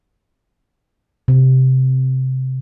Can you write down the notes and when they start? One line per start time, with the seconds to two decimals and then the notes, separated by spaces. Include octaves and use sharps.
1.28 C3